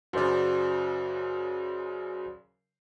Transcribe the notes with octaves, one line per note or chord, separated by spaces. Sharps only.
F#2 C#3 F#4 C5 D5